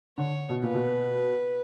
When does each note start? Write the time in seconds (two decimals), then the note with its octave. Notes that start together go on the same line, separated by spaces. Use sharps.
0.18 D3 C#5
0.49 B2
0.62 A#2 B4
0.74 B2